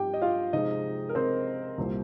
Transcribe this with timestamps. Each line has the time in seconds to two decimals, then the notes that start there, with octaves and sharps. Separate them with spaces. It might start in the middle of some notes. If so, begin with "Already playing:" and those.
Already playing: G2 F3 C4 D#4 G4 G5
0.14 D#5
0.22 F4 F5
0.53 C3 F3 G#3 C4 D#4 D#5
1.09 A#4
1.15 C4 C5
1.78 C2 A#2 G3 C4